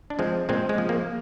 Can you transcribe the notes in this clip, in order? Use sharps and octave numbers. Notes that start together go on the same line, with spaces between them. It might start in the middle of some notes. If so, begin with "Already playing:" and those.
D4
F3 G#3 C4
A#2 G#3 C4
G#3
F3
A#3